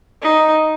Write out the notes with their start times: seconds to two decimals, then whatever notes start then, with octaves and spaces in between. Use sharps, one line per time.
0.22 D#4